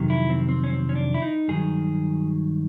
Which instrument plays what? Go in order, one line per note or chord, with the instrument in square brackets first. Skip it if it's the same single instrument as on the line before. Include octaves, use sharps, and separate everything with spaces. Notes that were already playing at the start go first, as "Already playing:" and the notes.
Already playing: [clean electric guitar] F2 C3 D#3 F#3
E4
C4
C4
C#4
C4
C#4
D4
E4
D#4
G2 D#3 F#3 G#4